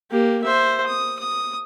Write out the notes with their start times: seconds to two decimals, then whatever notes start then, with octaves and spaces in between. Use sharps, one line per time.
0.11 A#3 G4
0.44 C5 E5
0.87 D#6
1.19 D#6